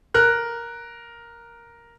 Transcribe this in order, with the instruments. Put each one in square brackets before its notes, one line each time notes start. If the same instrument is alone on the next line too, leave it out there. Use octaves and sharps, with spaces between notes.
[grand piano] A#4 F#6